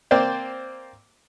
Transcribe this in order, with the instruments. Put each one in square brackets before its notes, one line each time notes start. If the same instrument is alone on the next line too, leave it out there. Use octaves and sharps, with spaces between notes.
[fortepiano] A#3 C4 C5 D5